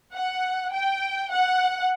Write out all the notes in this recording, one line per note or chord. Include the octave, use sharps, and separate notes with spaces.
F#5
G5
F#5